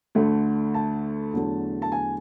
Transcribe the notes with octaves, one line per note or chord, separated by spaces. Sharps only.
D2 D3 A3
A5
E2 D3 F#3 A3
A5
G#5